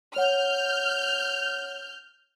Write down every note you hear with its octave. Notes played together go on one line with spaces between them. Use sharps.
C#5 F#5 F6 G6